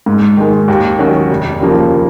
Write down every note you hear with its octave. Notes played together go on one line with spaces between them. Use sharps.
G#2
D#3 G#3
D#2
D#3 F#3 C#4 F#4
F1
D#2 C#3 F3 A#3